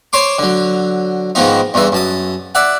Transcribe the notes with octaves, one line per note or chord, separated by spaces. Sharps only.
C5 C#5 C6 D6
D3 F#3
G#2 D#3 F3 B3 D#4
E2 G2 E3 E5
F#2 A5 D#6
D5 E5 F#5